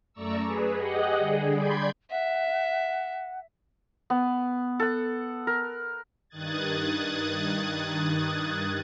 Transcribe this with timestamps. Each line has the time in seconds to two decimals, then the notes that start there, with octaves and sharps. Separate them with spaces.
0.13 F#2 A3 D5 A#5 C#6 E6
0.46 G#4 B4
0.75 G4 G#4 D#5 F#5
1.16 D3 G3 G#4
1.54 D5 B5 C6 G6 G#6
2.11 E5 F#5
4.10 B3
4.80 A4 F#5
5.47 A#4
6.30 G2 D#3 D#6 F#6 G#6 A6